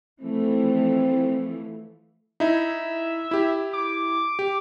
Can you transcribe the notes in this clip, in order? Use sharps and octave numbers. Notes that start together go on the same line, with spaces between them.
E3 F3 A3 C4
D#4 E4 E5
E4 G4
D6
G4